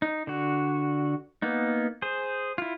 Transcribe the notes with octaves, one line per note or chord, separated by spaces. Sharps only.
D#4
D3 F#4
A#3 B3 D#4
G#4 C5
E4 F4